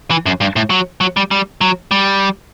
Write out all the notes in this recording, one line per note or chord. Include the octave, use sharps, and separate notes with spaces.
E3
F#2
G2
A2
F#3
F#3
G3
G3
F#3
G3